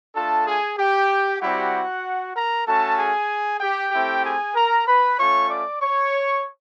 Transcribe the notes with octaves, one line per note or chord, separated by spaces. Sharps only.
A3 D4 F4 A4 A5
G#4 G#5
G4 G5
G3 C4 E4 F#4 G4 F#5
A#4 A#5
A3 C#4 F#4 A4 A5
G#4 G#5
G4 G5
A3 C4 E4 G4
G#4 G#5
A#4 A#5
B4 B5
A3 C#4 F4 C#5 C#6
D5 D6
C#5 C#6